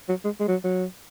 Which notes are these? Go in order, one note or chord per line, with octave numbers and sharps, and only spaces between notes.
F#3
G#3
G#3
F#3
F#3